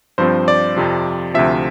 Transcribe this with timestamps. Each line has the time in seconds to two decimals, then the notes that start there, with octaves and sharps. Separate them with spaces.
0.18 G2 F3 C4 C5
0.48 D5
0.76 F2 C3 F3
1.34 D2 C3 F3 E5